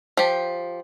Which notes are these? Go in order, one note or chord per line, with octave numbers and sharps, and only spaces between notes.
F3 G4